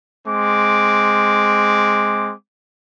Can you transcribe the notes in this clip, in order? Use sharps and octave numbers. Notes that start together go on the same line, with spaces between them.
G#3 C4 D6